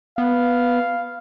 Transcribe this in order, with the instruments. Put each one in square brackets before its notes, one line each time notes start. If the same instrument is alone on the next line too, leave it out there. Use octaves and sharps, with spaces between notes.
[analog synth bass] B3 [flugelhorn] F5